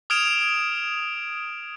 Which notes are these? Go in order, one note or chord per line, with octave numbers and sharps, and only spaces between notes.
D#6 F6 G#6 D7 E7 F7